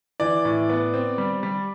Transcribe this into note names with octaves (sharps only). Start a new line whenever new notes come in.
E3 D5
A2
B3
C4
G3
G3